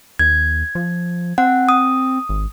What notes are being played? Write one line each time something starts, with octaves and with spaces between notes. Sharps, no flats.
D#2 G#6
F3
C4 F#5
D#6
G#1